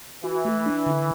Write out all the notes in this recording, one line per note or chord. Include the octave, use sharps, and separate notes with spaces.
E3 F#4
A3
D4
D3